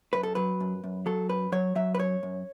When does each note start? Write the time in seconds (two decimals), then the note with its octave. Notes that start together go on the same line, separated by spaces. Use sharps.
0.13 F#2 B4
0.23 A4
0.35 F#3 B4
0.60 F#2
0.84 F#2
1.06 F#3 A4
1.29 F#2 B4
1.52 F#3 C#5
1.75 F#3 E5
1.95 B4
1.99 F#2 C#5
2.23 F#2